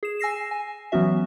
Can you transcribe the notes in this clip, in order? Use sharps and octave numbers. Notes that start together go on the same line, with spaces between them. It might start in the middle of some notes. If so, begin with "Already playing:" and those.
G#4 E7
G#5 E6 A#6 C7 E7
G#5
E3 F#3 B3 C#4 F#4 E5